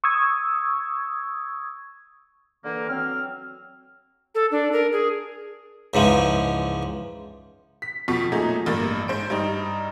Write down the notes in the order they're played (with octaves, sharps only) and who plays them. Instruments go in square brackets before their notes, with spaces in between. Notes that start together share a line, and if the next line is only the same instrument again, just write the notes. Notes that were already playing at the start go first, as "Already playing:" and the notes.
[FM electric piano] C#6 D#6 E6 G#6
[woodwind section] D3 E3 A#3
F#3 C4 F6
[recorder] A4
D4
A#4
G#4
[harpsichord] C#2 G#2 E3 F3
[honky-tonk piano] B6
F2 B2 F3 C#6 B6
A#2 F3 F#3 A3 D#4 G#4
A1 G2 A#3 A6
G#2 C5 D7
G2 G3 D#4